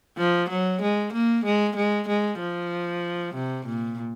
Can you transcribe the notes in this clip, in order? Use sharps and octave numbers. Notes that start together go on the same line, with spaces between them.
F3
F#3
G#3
A#3
G#3
G#3
G#3
F3
C3
A#2